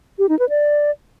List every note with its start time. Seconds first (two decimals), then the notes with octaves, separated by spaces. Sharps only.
0.19 G4
0.29 D#4
0.39 B4
0.49 D5